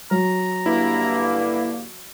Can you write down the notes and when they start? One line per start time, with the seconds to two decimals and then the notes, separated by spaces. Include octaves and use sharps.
0.11 F#3 A#5
0.66 G2 D3 A#3 E4